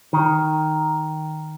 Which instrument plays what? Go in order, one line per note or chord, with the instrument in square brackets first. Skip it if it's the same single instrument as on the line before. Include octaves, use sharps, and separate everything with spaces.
[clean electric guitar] D#3